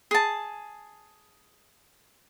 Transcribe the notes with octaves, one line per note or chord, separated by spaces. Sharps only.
G#4 A5